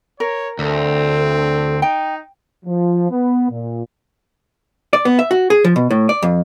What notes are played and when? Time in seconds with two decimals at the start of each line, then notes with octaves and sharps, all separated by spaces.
0.20 A#4 C#5
0.59 D2 C4 A4
1.82 D#4 G5
2.66 F3
3.11 B3
3.50 A#2
4.93 D5
5.05 B3
5.19 E5
5.31 F#4
5.50 G#4
5.64 F3
5.76 B2
5.90 A2
6.09 D5
6.23 F2